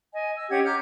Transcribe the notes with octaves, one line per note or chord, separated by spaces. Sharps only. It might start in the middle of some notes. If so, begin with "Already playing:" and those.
D#5 G#5
E6
C#4 G4 F#5 G#6
A#5 D6 F6 G6